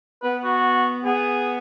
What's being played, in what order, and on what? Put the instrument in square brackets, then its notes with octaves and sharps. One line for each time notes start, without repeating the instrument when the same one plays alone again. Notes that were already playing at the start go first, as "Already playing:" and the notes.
[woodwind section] B3 [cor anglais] B4
[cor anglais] F#4
[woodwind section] B3 [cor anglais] G#4